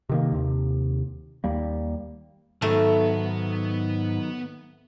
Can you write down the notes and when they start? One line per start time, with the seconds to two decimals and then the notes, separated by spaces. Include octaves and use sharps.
0.09 C3 D#3 A#3
0.32 D#2 C3
1.44 D#2 G3 A#3
2.62 G#2 D#3 F#3 A3 B3 B4